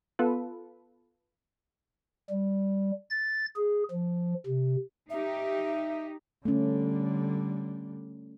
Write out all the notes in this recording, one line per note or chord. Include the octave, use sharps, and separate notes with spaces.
B3 F4 A4 B4
G3
A6
G#4
F3
C3
D#4 G4 E5
D3 G3 A3 C#4